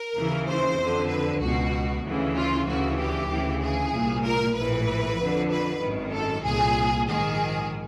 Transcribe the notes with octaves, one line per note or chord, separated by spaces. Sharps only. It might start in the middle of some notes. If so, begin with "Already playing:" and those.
Already playing: A#4
D#2 C#3 E3
C5
F2 D3
B4
C#2 B2 F#4
D2 C#3 E3
F4
D2 C#3 E3 F#4
G4
D2 C#3 E3
G#4
C2 A#2
A#4
A#1 A2 E3 B4
F2 D3
B4
G#1 F#2 D#3
A4
C2 A#2 G#4
A#1 G#2 D#3 G#4